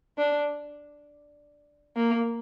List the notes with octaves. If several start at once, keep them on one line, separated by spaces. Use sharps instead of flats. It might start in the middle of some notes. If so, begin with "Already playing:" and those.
D4
A#3